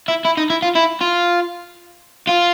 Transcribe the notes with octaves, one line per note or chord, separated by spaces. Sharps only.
E4
E4
D#4
E4
F4
E4
F4
F4